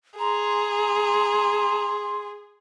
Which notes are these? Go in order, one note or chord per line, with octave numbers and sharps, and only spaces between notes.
G#4 A#5 C6